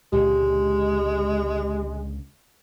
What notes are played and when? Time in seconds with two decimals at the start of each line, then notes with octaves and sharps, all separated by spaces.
0.12 C#2 A#2 D3 G#3 G4